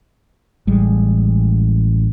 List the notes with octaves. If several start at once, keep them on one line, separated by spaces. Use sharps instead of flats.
A1 G3 G#3